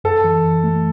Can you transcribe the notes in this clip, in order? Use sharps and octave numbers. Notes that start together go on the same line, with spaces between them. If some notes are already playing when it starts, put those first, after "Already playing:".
F#2 A4
E3
F#2
A3